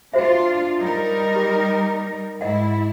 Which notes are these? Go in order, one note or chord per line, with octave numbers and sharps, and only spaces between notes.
D4 F4 F#4 C5 E5
G3 D#4 A#4
G4
G#2 E4 D#5 F#5